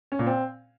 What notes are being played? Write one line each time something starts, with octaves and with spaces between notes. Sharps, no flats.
C#4
A#2
C4